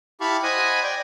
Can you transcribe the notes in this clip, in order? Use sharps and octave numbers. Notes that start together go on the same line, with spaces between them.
E4 G4 F5 A5 B5 C#6
C5 D#5 F#5 G#5 B5 D#6
D5 G5